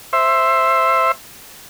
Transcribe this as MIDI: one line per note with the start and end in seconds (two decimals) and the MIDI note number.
0.13 1.12 72
0.13 1.12 76